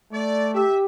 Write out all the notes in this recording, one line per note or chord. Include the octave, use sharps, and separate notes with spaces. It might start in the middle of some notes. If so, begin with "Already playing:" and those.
A3 D5
G4 E5